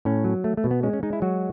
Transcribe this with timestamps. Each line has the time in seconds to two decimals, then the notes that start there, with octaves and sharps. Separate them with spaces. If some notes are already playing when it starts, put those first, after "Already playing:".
0.05 A2 C#4
0.24 F#3
0.44 A3
0.57 A3
0.64 B2
0.71 B3
0.83 G#3 C#4
0.93 C#4
1.03 G#3 D#4
1.13 E4
1.22 F#3 F#4